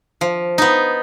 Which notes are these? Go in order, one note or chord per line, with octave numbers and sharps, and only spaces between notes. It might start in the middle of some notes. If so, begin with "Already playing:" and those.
F3
B3 D#4